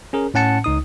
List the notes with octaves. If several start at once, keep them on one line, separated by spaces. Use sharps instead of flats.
C#4 G#4 A#4
A2 C#4 F#5 A5 C#7
C#2 D#4 D#6